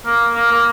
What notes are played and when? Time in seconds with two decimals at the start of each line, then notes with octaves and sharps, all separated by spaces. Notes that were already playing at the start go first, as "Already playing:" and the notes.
0.05 A#3
0.35 A#3
0.52 A#3